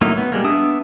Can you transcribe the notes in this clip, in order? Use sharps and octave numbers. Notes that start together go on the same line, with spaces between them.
F#3 A3 A#3 D#4 E4
B3
G3 G#3 A#3
B3 D4 E5 D#6